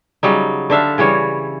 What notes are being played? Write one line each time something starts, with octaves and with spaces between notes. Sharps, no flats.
C#3 F#3 G3 D#4
D3 D4 E5 F5
C#3 E3 G3 C#5